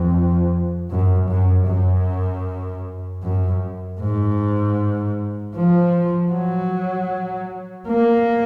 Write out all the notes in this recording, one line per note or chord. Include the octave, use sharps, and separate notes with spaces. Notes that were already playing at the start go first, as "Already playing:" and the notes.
Already playing: F2
F#2
F#2
F#2
F#2
G#2
F3
F#3
A#3